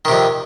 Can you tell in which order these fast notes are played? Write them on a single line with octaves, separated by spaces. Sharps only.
D#3 C3 F2